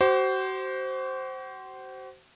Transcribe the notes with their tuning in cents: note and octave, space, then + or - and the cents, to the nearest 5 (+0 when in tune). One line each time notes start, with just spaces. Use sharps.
F#4 +40 C5 +0 D6 +0